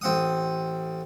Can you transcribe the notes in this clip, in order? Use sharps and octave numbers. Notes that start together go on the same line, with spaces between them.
A1 C4 F#5 D#6